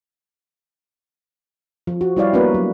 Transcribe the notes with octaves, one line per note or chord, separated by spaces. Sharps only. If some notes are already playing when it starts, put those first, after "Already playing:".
F3
F#4
G3 E4 G4 C#5 D5 F5
A#3 B3 D4 F#4 A#4 B4
F#3